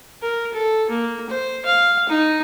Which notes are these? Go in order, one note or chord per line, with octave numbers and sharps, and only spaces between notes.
A#4
A4
A#3
C5
F5
D#4